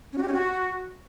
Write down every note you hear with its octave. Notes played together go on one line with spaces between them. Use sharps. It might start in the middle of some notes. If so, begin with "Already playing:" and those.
C#4
F#4
G4
C#4
F#4